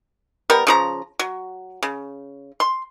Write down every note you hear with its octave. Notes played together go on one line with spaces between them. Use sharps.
G3 B3 A#4
C#3 F3 A#5
F#3
C#3
C6